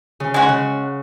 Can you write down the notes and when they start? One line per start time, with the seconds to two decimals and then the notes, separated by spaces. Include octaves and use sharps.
0.20 C#3
0.34 G#3 C#4 F#4
0.49 C#3